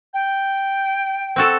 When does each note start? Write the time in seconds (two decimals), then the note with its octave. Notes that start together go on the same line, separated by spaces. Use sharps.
0.13 G5
1.36 C4 F#4 A4